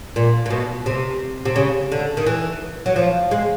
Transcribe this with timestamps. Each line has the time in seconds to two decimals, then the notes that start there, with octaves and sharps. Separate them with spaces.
0.16 A#2
0.46 A#2
0.50 B2
0.86 C3
1.45 C3
1.56 C#3
1.92 D3
2.17 D#3
2.26 E3
2.86 F#3
2.96 F3
3.31 G#3